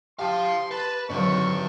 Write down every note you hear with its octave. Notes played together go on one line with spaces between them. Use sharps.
G4 F5 A5 C6
B4 A5
G#1 D3 F#3 B4 D5 C#6